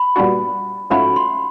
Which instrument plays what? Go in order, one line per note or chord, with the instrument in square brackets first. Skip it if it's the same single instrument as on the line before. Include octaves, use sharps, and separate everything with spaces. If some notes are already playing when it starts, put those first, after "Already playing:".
Already playing: [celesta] B5
[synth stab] A#2 G3 B3 D4 F#4
[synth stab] G#2 F3 A3 C#4 F#4 [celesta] B5
[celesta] C6